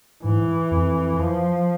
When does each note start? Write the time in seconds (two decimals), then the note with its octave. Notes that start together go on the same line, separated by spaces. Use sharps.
0.24 G#2 E3
0.71 F2
1.19 F3